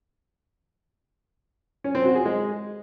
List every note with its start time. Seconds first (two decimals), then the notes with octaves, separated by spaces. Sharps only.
1.84 C#4
1.95 C4
2.05 F#4
2.15 G#4
2.25 G#3